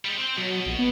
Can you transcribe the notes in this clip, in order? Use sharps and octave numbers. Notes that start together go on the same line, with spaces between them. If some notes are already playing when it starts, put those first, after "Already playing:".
G3 G#3
C4 C5
B2 F#3
A#1
B3